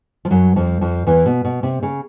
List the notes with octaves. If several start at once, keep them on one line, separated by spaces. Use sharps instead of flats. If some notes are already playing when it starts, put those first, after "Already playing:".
F3
F#2 F#3
F2 F3
F2 F3
E2 E3
B2
B2
C3
C#3